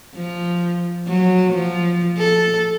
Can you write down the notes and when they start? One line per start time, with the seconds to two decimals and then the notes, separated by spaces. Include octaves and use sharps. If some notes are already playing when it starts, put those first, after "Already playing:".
0.15 F3
1.08 F#3
1.53 F3
2.18 A4